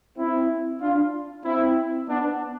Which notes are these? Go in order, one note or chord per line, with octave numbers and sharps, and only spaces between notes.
C4 E4
D4 F4
C4 E4
B3 D4